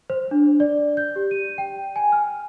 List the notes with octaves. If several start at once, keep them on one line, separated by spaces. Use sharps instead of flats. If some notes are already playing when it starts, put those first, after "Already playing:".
C5
D4
D5
G6
G4
D#7
G5
G#5
F6